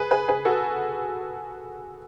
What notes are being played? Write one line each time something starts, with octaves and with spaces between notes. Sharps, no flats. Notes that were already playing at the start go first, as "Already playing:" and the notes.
Already playing: G#4 B4
G#4 B4
G#4 B4
F#4 A4